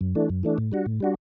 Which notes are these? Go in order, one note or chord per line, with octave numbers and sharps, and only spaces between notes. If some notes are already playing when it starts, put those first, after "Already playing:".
F#2
E3 A3 D4
F#2
E3 A3 D4
A2
G3 D4 F#4
A2
G3 D4 F#4